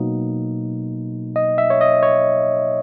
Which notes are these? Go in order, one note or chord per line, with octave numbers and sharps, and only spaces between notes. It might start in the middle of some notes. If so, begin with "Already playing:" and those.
Already playing: B2 F#3 A#3 D#4
D#5
E5
C#5
D#5
C#5